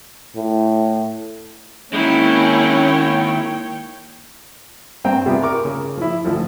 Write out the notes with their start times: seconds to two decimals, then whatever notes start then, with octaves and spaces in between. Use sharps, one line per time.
0.36 A2
1.93 D#3 G#3 A#3 C#4 E4 C#5 G5
5.04 G2 C4 G5 A#5
5.26 C3 G3 B3 F4 G#4
5.43 A#4 C#6 D6
5.65 C#3
5.97 F3 E4
6.25 G#1 D2 F3 A4